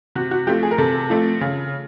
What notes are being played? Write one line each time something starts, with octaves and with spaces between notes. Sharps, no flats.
C3 F#4
F#4
F3 A3 C4 G4
G#4
A#4
C3 A4
F3 A3 C4
C#3